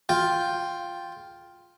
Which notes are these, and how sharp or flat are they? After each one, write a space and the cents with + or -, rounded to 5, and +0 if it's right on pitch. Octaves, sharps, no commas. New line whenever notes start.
F4 +5 G5 +0